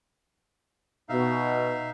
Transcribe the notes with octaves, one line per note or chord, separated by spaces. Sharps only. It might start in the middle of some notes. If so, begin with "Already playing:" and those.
B2 D#4 E5 F5